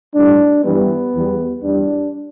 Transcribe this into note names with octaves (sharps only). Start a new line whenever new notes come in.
A2 G3 D4
G2 E3 G3 B3
E2 E3 G3
E2 E3 G3 D4